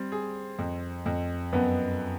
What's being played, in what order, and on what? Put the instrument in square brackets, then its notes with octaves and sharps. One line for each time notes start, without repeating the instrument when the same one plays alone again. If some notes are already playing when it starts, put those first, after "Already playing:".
Already playing: [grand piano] G3 [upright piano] C4
[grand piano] G#4
F2
F2
[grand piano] F#2 [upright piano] B3